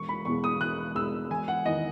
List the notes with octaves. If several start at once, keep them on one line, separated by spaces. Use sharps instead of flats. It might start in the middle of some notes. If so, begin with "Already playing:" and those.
Already playing: E1 C#6
B5
E2 B2 G#3 C#6
D#6
E1 F#6
E2 B2 G#3 E6
E1 G#5
F#5
E2 D#3 D#5